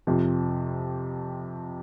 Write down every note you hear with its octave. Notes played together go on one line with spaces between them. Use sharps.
F2 C3 F3